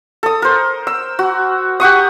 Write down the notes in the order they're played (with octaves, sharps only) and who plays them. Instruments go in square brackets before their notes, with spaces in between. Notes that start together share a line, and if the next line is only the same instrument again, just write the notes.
[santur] A4 D#6
A#4 C5
E6
F#4
G4 F#5 C#6 D#6